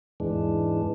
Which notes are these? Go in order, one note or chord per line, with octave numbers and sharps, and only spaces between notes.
E2 G#2 E3 G#3 D4